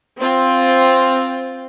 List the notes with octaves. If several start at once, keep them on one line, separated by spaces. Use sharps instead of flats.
C4 F4